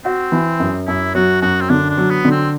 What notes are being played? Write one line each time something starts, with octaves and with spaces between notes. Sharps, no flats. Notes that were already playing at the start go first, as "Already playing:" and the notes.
C4 F#4
E3
F#2
F#2 E4
F#3 F#4
F#2 F#4
C4
D3 D4
D4
F#3
B3
D3
C4